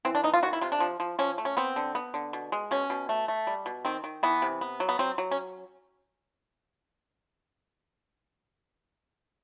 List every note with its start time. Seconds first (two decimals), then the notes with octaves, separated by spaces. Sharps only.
0.05 E3 C4
0.15 D4
0.24 B3 D#4
0.34 F4
0.43 D#3 F#4
0.53 E4
0.61 C3 F4
0.72 D4
0.80 F3
1.00 F3
1.19 F3 C#4
1.38 A3
1.45 C#4
1.57 B3 C4
1.76 D3
1.95 B3
2.14 D3
2.33 B2
2.52 G#3
2.71 B2 C#4
2.90 B2
3.09 A3
3.28 A3
3.47 G3
3.66 B2
3.85 D#3 C4
4.04 D#3
4.23 E3 B3
4.42 C3
4.61 B3
4.80 F#3
4.89 B3
4.99 F#3 C4
5.18 F#3
5.31 C#4